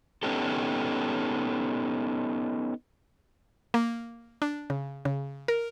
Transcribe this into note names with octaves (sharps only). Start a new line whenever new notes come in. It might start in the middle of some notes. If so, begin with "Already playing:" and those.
B3 C#4 D#4 G4 A4
A#3
D4
C#3
C#3
A#4